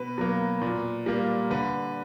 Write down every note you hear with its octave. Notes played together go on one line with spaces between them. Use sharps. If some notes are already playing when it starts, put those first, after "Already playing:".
Already playing: B2 B4
F#3 A#3
A#2
G3 A#3
D3 B4